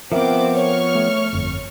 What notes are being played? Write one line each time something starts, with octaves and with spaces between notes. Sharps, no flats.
F3 B3 C4 A#4 E5 D6
C#5 C#6 F6
A3
G1 F2